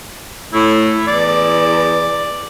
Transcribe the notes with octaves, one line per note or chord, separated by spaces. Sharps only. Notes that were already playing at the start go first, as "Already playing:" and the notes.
A2 E4
E2 D5